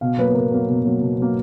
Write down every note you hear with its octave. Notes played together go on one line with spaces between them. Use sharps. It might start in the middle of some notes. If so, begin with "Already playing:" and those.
B2 F5
F#3 A#3 B4
B4
B2 A#4
F#3 A#3
B2
F#3 A#3
B2
F#3 A#3